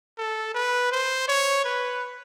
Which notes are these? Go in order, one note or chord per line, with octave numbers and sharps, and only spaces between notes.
A4
B4
C5
C#5
B4